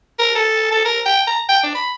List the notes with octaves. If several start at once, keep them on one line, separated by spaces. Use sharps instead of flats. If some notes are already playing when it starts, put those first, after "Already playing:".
A#4
A4
A4
A#4
G5
A#5
G5
D4
B5